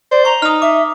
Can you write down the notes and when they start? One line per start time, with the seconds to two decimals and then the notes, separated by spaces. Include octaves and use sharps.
0.11 C5 D5
0.25 A#5 C#6
0.42 D#4 D#6 F6
0.62 E5 D6